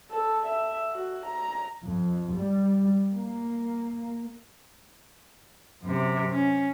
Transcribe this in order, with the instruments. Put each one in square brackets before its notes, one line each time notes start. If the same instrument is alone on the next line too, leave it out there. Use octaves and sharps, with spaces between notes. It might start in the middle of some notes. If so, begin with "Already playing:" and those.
[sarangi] A4
E5
F#4
A#5
[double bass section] F2
G3
A#3
[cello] F#2 C3
C#4